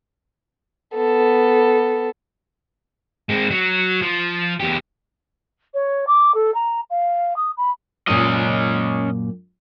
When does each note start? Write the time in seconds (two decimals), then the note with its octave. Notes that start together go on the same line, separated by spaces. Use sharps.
0.96 B3 A4
3.29 G#3 C4
3.51 F#3
4.02 F3
4.60 E2 G4
5.74 C#5
6.07 D6
6.34 A4
6.54 A#5
6.90 F5
7.36 D#6
7.57 B5
8.07 F#2 A#2 C#4 D#5